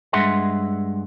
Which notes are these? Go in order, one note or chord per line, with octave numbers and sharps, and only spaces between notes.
G2 G#3 E5 F#5 C6